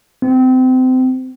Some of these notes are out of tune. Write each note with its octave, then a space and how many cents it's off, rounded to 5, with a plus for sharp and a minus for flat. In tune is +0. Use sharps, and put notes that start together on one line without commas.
C4 -30